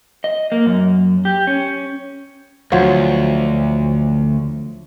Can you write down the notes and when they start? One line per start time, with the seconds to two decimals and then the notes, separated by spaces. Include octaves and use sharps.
0.24 D#5
0.52 A#3
0.66 F#2
1.25 G4
1.47 C#4
2.72 D2 F3 F#3